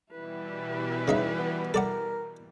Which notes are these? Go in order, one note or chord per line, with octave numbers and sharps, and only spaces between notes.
B2 E3 G3 E4 B4
C#3 D#4 E5
B3
A4 A#4 D5 F#5